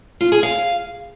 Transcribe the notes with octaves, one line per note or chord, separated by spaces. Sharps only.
F4
G#4
F5